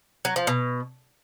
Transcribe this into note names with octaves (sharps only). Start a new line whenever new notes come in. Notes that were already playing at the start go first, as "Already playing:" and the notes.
F#3
F3
B2